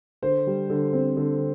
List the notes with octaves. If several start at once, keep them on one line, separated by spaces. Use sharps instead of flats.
D3 C5
G3
D3
C4
D3